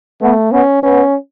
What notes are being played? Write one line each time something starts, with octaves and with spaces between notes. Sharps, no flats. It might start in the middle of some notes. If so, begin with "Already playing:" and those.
A3 B3
B3 C#4
B3 C#4